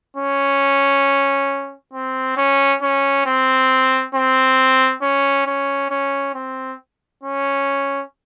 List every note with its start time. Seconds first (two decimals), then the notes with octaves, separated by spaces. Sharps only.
0.16 C#4
1.93 C4
2.37 C#4
2.82 C#4
3.26 C4
4.15 C4
5.02 C#4
5.46 C#4
5.90 C#4
6.35 C4
7.23 C#4